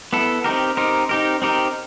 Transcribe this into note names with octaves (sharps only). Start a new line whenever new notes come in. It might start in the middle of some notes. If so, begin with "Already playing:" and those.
B3 E4 A4
C4 D#4 G4 A#4
C4 D#4 G4 A#4
C4 D#4 G4 A#4
C4 D#4 G4 A#4